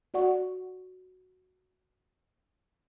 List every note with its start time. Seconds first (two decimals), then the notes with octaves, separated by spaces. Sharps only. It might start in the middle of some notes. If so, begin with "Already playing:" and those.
0.14 F#4 D5 F#5 C#6